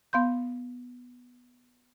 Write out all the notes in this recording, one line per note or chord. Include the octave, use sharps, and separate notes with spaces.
B3 F5 C6 G6